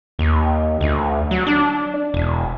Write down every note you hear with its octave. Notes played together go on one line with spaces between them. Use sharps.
D#2
D2
F#3
D4
E1